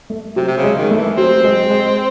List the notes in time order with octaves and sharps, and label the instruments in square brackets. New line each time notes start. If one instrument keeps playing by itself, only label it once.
[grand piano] A3
[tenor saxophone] C3 [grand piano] F#3
[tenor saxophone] C3
C#3
[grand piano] G#3
[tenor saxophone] D#3
[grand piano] A3
[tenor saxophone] E3
[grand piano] F#3 [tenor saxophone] C4
[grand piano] G#3
G#3